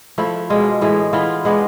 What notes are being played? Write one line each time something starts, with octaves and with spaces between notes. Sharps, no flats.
F3 A3 E4 A4
B2 G#3 D4 F4
A2 E3 G#3
E3 B3 F4
G#3 B3 D4